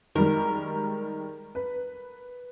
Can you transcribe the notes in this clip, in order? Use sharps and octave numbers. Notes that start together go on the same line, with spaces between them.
D#3 G3 G#3 A#4
B4